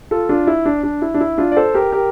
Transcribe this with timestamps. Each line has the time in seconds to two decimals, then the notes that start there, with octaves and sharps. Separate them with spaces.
0.11 F4 A4
0.29 D4 F4
0.47 E4
0.66 D4
0.83 D4
1.02 E4
1.14 D4
1.21 E4
1.38 D4 F4
1.52 D5
1.57 A4 C5
1.75 G4 A#4
1.92 G4 A#4